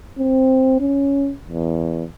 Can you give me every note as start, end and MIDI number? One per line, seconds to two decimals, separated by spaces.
0.19 0.78 60
0.80 1.33 61
1.49 2.04 40